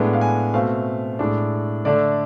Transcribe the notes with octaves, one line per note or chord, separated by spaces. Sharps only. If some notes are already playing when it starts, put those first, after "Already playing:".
Already playing: A2 G#3 B3 D4
F5
G#5
B2 A3 C4 F5
A2 G#3 D4
D3 A3 D4 D5